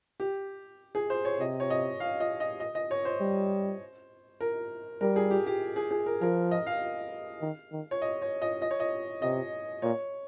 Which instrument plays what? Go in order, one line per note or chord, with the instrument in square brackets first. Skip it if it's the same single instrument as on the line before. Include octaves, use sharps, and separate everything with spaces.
[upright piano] G4
G#4
C5
C#5
[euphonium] C3 [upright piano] D#5
[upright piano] C#5
D#5
F5
D#5
D#5
D#5
D#5
C#5
C5
[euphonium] G3
[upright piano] A#4
[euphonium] G3 [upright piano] A#4
[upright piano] G#4
G4
G4
G#4
G#4
A#4
[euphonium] F3 [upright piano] A#4
[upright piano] D#5
F5
[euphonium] D#3
D#3
[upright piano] C#5
D#5
C#5
D#5
D#5
C#5
D#5
[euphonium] C3 [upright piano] D#5
[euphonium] A#2 [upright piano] C#5